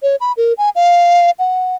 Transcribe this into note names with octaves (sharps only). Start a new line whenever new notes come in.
C#5
B5
A#4
G#5
F5
F#5